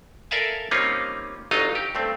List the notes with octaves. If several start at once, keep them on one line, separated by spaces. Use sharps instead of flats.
A4 A#4 D5 E5 F5 G#5
G3 A#3 C4 C#4 D#4 F4
G1 F#3 D#4 F4 D#5 F5
G4
G2 A3 C4